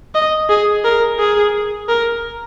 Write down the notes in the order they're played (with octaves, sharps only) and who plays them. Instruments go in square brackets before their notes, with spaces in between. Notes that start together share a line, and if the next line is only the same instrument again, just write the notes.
[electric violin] D#5
G#4
A#4
G#4
A#4